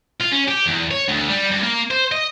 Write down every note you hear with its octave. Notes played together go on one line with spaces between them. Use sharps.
F4
C#4
G4
E2
C#5
D2
G3
G2
A#3
C5
D#5